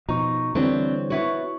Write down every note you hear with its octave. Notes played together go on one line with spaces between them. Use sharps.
B2 F3 D#4 A#5 C#6
D3 E3 G3 B3 C4 D4 C5 C#5
B3 E4 F#4 C#5 C#6